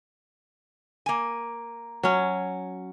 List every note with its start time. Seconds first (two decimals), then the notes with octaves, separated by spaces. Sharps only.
1.06 A#3 G#5
2.03 F#3 C#4